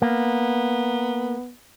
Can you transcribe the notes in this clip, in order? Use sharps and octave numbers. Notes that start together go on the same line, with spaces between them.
A#3 B3